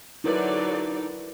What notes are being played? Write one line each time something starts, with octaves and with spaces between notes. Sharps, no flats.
D3 F#3 D#4 E4 A#4 B4 D5